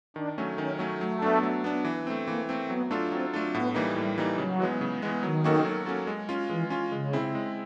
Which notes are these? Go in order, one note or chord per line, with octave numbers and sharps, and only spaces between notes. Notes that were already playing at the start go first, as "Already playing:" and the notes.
D#3 D4
F#3 A3 C#4
D#3 C#4
F#3 A3 C#4
F#3 A3
B3 D4
F#3
B3 D4
E3
A3 C4
E3 A#3
A3 C4
F#3 B3
A3 D4 F4 A4
F#3 C4
A3 D4 F4 A4
A2 B3
E3 G3 A#3 D#4
A2 G3
E3 G3 A#3 D#4
C#3 F#3
E3 G#3 B3
C#3
E3 G#3 B3
D#3 F#3
A#3 C#4 F#4 A4
F#3
A#3 C#4 F#4 A4
G#3
C#4 F4
E3 G#3
C#4 F4
C#3 G#3
C4 E4
G#3